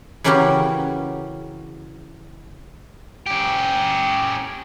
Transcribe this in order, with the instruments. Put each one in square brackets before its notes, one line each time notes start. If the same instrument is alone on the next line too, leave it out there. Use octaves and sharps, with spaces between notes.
[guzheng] C#3 E3 A#3 C#4 F#4 G4
[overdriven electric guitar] C#4 G4